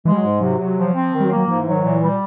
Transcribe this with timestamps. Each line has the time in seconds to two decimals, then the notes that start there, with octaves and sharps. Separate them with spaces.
0.05 E3 G#3
0.12 G3
0.17 F#3
0.24 G#2
0.41 C3 F#3
0.59 C3
0.76 F3
0.95 C4
1.13 D#3
1.20 G3
1.25 F#3
1.31 A#3
1.36 F#3
1.48 G#2 F3
1.60 E3
1.67 D#3 F#3
1.83 A#2 E3
2.02 G3